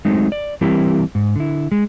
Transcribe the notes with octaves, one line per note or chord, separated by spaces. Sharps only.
F#3 G#3 A3 C4 D#4
D5
E3 G3 C4 E4 G4 A#4
G#2
D3 E4
G#3